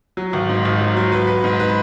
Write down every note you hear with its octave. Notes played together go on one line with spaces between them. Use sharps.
F#3
G#1
G#2
G#1
F#3
F#3
B4
B4
G#2
B4